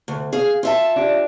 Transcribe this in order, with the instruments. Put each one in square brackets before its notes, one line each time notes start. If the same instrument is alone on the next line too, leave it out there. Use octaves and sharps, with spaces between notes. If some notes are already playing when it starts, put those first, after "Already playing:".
[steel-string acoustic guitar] D2
G#4 F5
F4 E5 A5
[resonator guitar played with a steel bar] D4 G4